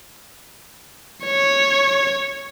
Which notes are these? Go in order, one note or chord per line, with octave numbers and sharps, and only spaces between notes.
C#5